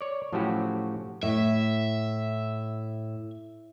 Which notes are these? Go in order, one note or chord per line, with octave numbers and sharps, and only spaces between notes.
C#5 D5
A2 F3 F#3 C#4 F#4 G4
A2 E5